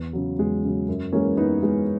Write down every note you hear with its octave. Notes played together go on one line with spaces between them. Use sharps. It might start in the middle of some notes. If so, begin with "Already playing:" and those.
Already playing: E2
C#3 F#3
E2 G#3
C#3 F#3
F#2
E3 G#3 A#3 C#4
F#2 B3 D#4
E3 G#3 B3